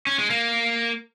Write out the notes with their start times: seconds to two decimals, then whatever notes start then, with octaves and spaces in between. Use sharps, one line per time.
0.07 C#4
0.18 G#3
0.30 A#3